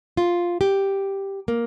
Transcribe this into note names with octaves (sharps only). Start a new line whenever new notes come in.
F4
G4
A#3